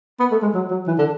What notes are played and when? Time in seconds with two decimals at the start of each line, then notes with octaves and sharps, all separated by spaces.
0.20 B3
0.32 A3
0.42 G#3
0.54 F#3
0.70 F#3
0.88 E3
0.98 D3